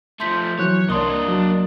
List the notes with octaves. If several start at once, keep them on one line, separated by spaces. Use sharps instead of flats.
F3 A3 C6 G6 B6
E3 F#3 C#5 F#6
C2 A#3 D4 D5 D#5 C6 D#6
F#3